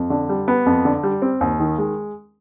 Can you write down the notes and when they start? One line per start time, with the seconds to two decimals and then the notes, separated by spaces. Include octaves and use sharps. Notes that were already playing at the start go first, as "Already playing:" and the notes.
Already playing: F2
0.10 D3
0.29 G3
0.48 B3
0.66 F2
0.85 D3
1.03 G3
1.22 C4
1.41 D#2
1.60 D#3
1.78 G#3